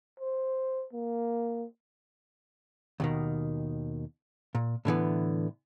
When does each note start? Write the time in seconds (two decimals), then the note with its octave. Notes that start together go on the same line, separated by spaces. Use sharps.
0.20 C5
0.93 A#3
3.00 D#2 B2 D#3
4.55 A#2
4.85 A2 D3 E3 B3